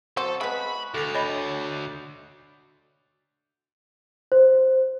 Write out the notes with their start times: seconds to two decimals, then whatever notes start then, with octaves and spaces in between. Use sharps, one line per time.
0.17 F#3 C4 A4 C5 C#6
0.41 G#3 B3 B5 D#6 F#6
0.94 D2 A4 D6 A6 F7
1.15 C#5 D#5 B5 G6 F7
4.32 C5